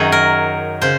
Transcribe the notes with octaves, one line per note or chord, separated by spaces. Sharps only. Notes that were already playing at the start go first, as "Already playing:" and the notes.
Already playing: F#2 D#3 F#3 G#4
A#4
C#3 C5